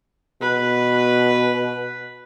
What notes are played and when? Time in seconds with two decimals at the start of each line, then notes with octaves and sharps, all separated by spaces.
0.41 B2 B4